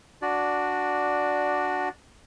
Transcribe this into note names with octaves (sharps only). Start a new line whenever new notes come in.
D4 F#4 D5